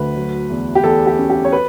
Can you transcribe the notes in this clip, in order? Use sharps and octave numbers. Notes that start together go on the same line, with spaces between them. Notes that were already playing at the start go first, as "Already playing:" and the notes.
Already playing: D2 B4
F#3
E2
G4
E2 A4
G4
C#4
G4
C#5
B4